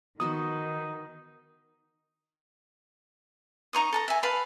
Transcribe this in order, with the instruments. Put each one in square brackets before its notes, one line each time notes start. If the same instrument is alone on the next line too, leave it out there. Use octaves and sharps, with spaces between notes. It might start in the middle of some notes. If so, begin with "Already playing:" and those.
[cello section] D#3 [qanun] B3 F#4 C5 [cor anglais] D#4 [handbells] D#6
[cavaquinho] D#4 A#5 C#6 D#6
A4 A5 A#5
E5 G#5
B4 F5 A5 B5